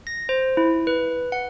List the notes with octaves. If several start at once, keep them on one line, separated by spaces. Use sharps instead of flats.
A#6
C5
E4
B4
F#5